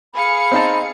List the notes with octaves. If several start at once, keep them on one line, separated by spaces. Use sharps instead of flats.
G#4 F5 B5 C#7
C4 D#4 A5